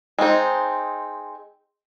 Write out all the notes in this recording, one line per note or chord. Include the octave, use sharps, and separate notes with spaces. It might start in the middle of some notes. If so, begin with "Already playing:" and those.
G#3 C4 D#4